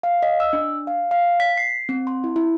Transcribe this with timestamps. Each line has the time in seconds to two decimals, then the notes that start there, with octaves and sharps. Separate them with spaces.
0.03 F5
0.23 D#5
0.40 E6
0.53 D4
0.87 F5
1.11 F5
1.40 B6
1.57 C7
1.89 C4
2.07 C6
2.24 E4
2.36 E4